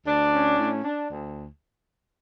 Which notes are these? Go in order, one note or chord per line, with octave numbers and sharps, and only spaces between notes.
D2 D4
C#4
A2
D4
D2